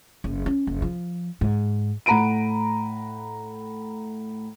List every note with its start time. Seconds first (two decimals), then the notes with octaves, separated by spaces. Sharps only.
0.24 F#1
0.46 C#4
0.67 F#1
0.82 F3
1.41 G#2
2.06 A2 F#5 A#5 B5 D7 D#7